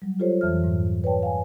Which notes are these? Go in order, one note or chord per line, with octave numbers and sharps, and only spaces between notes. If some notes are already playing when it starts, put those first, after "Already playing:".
F#3 G3
F4 G4 A4 C5 C#5
F2 E3 E5 F6
G#2
B4 C#5 D5 G5 A5
F5 G#5